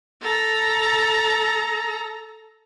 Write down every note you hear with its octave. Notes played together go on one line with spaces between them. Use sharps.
A4 A#5